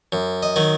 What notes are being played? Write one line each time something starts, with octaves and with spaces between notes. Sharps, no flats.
F#2
D#5
D#3 F#3